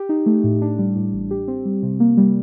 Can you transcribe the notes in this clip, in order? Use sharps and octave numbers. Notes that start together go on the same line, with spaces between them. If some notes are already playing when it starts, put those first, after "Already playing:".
Already playing: G4
D#4
A3
A2
D4
G3
A2
A1
G4
C4
G3
C3
A#3
G3